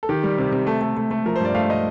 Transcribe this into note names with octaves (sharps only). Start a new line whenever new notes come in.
A4
D#3 G4
G3
C3
C3
A3 A4
A3
A3
A3
F3 A#4
C5
G2 D5
A3 F5
D#5